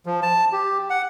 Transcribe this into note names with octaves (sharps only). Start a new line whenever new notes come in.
F3
A5
G4
F#5